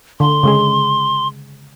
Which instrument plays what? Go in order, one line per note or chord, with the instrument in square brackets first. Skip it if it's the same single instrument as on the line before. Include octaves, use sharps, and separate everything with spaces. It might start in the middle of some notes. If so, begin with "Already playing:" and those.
[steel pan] D3 [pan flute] C6
[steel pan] C#3 G#3 G#4